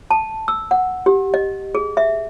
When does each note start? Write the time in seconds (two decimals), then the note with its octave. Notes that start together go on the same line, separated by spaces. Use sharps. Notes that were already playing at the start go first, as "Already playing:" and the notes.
0.11 A5
0.48 E6
0.71 F#5
1.06 G4
1.34 D#5
1.75 G#4
1.97 E5